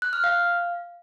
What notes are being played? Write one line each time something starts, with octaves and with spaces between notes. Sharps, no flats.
F#6
F6
F5